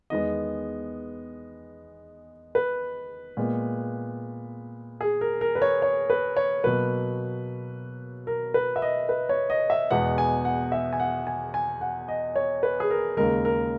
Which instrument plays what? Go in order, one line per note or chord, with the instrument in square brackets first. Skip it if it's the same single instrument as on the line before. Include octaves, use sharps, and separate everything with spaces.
[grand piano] E2 D#3 G#3 B3 D#5
B4
A#2 G#3 B3
G#4
A#4
A#4
B4
C#5
C#5
B4
C#5
B2 F#3 A#3 B4
A#4
B4
E5
D#5
B4
C#5
D#5
E5
E2 B2 G#3 B3 F#5
G#5
F#5
E5
G#5
F#5
G#5
G#5
F#5
D#5
C#5
B4
G#4
A#4
D#2 C#3 G#3 A#4
A#4